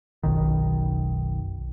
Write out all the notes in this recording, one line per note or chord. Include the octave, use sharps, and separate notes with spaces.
F#1 B1 B2 D#3